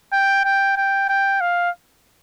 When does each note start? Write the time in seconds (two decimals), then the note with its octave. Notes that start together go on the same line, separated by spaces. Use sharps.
0.12 G5
0.44 G5
0.77 G5
1.09 G5
1.41 F5